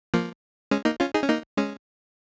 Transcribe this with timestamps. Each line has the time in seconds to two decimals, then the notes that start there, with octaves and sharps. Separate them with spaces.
0.14 F3 A#3
0.71 G#3 C#4
0.85 A#3 D#4
1.00 C#4 F4
1.14 D#4 G#4
1.23 C#4
1.29 A#3 D#4
1.57 G#3 C#4